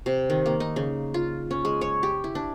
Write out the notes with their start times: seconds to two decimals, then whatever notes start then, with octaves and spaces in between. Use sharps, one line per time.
0.06 C3
0.30 D#3
0.46 A#3
0.60 D#4
0.76 C#3
1.14 F4
1.51 C#4
1.65 G#3
1.81 C#5
2.03 G4
2.24 E4
2.35 D4